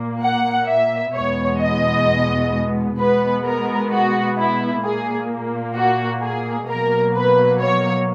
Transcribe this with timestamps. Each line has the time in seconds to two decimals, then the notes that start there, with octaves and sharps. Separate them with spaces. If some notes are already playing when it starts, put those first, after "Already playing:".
Already playing: A#2 A#3
0.22 F#5
0.67 E5
1.14 E2 B2 G#3 B3 C#5
1.60 D#5
2.99 B2 G#3 B3 B4
3.44 A#4
3.90 F#4
4.37 E4
4.83 A#2 A#3 G#4
5.75 F#4
6.21 G#4
6.68 B2 F#3 A#3 A#4
7.14 B4
7.60 C#5